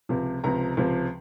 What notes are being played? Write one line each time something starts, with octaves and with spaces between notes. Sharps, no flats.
C#2 C3 F3
C#2 C3 F3 A#5
C#2 C3 F3